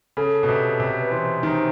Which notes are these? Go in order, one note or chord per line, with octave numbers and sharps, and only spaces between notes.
C#3 A4
B2
C3
C3
B4
E3 C5
D#3